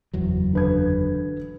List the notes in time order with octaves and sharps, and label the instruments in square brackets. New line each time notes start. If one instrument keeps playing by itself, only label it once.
[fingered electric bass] F#1 E2 F#3
[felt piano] D3 B4 G#6